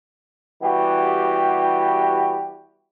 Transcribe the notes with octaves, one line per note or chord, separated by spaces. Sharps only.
E3 G3 B3 F#4 G4